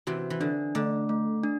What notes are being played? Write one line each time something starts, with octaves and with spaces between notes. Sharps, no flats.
C3 E3 F#4
E3
D3 D4
D3 A3
A3
D4